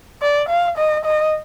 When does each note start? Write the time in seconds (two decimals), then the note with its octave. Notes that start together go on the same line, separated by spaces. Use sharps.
0.22 D5
0.49 F5
0.78 D#5
1.05 D#5